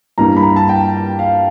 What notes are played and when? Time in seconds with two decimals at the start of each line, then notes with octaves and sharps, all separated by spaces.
0.18 G2 E3 G3 A#3 A#5
0.37 B5
0.43 A#5
0.56 A5
0.69 G5
1.19 F5